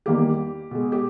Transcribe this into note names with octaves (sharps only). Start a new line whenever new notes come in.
E2 D#3 G3 A#3 G4
B2 G#3
G4